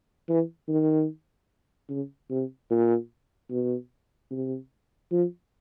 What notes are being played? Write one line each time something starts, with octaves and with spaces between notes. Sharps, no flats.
E3
D#3
C#3
C3
A#2
B2
C3
F3